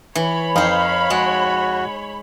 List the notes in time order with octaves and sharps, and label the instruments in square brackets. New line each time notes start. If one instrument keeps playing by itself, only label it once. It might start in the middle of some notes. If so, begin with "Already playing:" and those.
[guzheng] E3 [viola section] C#5 B5
[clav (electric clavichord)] F2 [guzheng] D#4 C5 [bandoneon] F5
[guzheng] G#3 [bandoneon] F#4